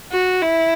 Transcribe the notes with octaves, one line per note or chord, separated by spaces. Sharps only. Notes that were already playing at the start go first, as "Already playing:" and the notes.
F#4
E4